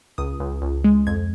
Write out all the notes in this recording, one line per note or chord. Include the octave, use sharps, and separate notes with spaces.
C#2 D#6
C#2
C#2
G#3
F2 G#6